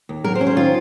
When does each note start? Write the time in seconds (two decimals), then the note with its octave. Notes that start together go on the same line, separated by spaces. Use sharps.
0.09 D#2
0.24 F#3 A#4
0.35 C5
0.41 C#4
0.47 C5
0.57 D#3 F4